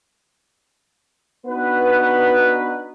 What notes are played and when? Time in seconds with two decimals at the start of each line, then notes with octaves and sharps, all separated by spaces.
1.46 B3 D4 D#4 F#4 B4